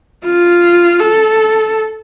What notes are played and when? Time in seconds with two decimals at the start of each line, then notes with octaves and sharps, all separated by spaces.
0.25 F4
1.00 A4